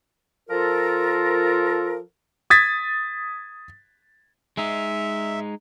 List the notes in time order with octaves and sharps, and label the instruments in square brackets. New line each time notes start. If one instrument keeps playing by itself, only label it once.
[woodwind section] F3 F4 A4 A#4
[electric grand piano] D#6 G#6 A6 B6
[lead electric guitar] G#3 D#4 [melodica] E5